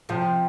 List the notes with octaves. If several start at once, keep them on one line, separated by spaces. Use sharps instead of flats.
C3 F3